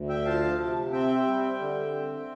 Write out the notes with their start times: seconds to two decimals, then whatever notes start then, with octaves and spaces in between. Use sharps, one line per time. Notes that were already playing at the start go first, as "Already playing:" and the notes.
Already playing: D2
0.09 E5 G5
0.25 F3 F5 A5
0.60 C3
0.93 C4 E5 G5
1.27 G3
1.60 D3
1.94 C4